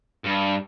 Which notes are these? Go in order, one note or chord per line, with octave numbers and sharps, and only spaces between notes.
G2